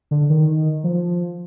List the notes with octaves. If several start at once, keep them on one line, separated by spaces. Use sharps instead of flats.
D3
D#3
F3